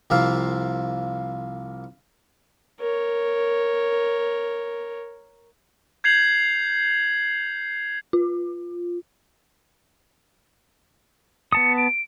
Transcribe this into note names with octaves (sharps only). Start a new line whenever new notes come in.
C2 F3 A#3 C4 E5 F5
A#4 C#5
G6 G#6 C7 F7 F#7
F4
B3 A5 D#6 C#7
D7